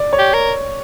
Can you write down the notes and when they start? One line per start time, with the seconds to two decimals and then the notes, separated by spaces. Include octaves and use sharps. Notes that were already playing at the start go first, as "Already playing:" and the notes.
Already playing: D5
0.13 C#5
0.18 G4
0.34 A#4